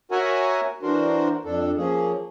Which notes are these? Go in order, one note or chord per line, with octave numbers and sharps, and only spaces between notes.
F#4 A#4 C#5 E5 F#5 G#5
E3 D4 F#4 A#4 C5
F2 D4 A4
F3 A#3 C#4 G#4